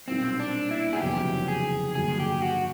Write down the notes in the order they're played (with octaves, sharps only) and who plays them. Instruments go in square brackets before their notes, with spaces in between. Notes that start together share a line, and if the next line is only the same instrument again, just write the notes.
[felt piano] B1 A#2 G3 A#3 C#4 [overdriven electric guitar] C4
[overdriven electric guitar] D4
E4
G#4
[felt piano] F1 E2 C#3 F#3 B3 [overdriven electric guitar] G4
[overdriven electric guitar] G#4
[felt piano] G2 D3 F#3 A#3 D4 [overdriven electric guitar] G#4
[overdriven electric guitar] G4
F#4